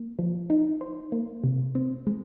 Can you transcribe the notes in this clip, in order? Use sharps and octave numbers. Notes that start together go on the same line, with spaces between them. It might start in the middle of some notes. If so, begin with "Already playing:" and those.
Already playing: A#3
F3
D#4
C5
A#3
C3
C4
G#3